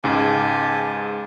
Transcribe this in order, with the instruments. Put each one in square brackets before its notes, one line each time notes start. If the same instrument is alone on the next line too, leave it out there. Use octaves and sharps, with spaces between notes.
[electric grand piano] C#2 G#2 [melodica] G4 G#5 A5